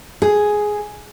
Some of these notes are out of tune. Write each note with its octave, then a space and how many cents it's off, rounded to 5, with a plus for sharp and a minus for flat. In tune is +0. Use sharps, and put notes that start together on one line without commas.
G#4 +5